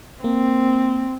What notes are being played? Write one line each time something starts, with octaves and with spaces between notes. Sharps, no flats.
A#3 C4